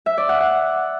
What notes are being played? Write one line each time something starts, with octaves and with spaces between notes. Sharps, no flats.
E5
D5
F#5
F#5